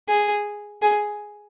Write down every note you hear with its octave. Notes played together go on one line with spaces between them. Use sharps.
G#4
G#4